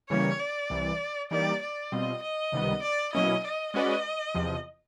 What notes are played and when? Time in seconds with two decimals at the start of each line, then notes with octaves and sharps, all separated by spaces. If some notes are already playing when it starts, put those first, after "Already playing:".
0.10 C#3 E3 G3 A#3 C#4 C#5
0.40 D5
0.70 C2 C3 E3
1.31 E3 G3 A#3 D#4 G4 D5
1.62 D5
1.92 B2 G3 C4 F4 D#5
2.23 D#5
2.52 C#2 C3 D#3 G3 B3
2.83 D5
3.13 B2 F#3 A#3 C#4 E4 D#5
3.44 D#5
3.74 G#3 C#4 F#4 B4 D5 D#5
4.35 E2 C3 F3